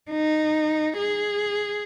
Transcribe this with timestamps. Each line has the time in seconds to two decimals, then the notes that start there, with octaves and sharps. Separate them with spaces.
0.11 D#4
0.98 G#4